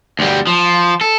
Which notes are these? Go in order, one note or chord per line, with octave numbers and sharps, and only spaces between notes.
D2 G3
F3
A4